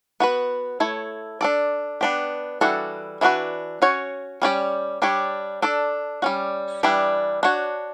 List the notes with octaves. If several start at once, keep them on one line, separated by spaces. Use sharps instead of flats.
B3 F#4 B4
A3 E4 A4 C#5
D4 A4 D5
B3 D4 G4
E3 G3 D4 F#4 A4
E3 B3 D4 F#4 B4
C#4 F#4 C#5
G3 C#4 G4 D5
G3 D4 G4 C#5
D4 A4 D5
G3 C#4 F#4
E3 G3 D4 G4
D4 F#4 C#5